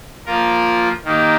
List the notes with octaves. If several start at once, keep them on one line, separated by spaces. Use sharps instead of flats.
F3 A#3 F4 A#4
D#3 A#3 D#4 G4